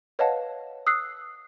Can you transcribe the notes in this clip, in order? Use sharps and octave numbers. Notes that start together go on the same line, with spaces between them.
B4 C#5 D#5 F5 F#5 A5
D#6 E6 F#6 C7